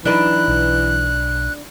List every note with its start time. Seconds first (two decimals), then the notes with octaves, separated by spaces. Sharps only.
0.05 E3 F#3 D4 D#4 B4 F#6
0.48 B1